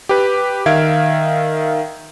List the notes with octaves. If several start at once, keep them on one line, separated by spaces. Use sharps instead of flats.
G4 B4
D#3 E5 F5 G#6 D7